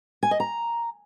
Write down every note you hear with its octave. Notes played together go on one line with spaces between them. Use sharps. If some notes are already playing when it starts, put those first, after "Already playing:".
G#5
D#5
A#5